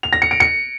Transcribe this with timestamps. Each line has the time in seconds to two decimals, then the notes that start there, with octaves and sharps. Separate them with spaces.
0.03 F7
0.13 A#6
0.22 C#7
0.31 D7
0.40 C#7